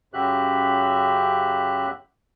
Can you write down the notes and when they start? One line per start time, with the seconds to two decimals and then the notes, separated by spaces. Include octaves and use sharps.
0.14 F#2 C#3 F#4 G4 E5 F#6